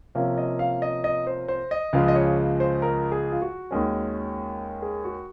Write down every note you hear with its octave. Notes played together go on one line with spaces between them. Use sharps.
C3 F3 A#3 C#4 F5
D#5
F5
D#5
D#5
C5
C5
D#5
C#2 C#3 F3 G#3 F5
D#5
C#5
C5
A#4
G#4
F4
F#4
D#2 D#3 G#3 C#4
G#4
F#4